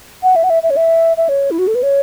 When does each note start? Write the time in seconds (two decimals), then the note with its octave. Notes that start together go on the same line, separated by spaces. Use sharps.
0.23 F#5
0.36 E5
0.44 F#5
0.50 E5
0.63 E5
0.70 C#5
0.77 E5
1.17 E5
1.29 C#5
1.51 E4
1.59 F#4
1.67 A4
1.75 B4
1.83 C#5